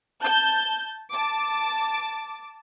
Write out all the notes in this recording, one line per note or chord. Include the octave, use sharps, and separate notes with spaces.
A5 G6
A5 D6